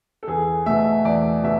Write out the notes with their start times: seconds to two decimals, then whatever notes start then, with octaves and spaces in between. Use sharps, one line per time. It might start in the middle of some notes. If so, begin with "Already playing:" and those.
0.23 A4
0.28 E2 G#4
0.66 B2 A3 E5
1.05 E2 D5
1.43 B2 E5